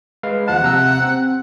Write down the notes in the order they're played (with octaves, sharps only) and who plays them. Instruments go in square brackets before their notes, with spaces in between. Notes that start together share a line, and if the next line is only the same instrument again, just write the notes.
[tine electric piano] G#3 B4 F5
[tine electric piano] D#2 F3 A5 [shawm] F#5
[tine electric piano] C3 A#5 E6
C4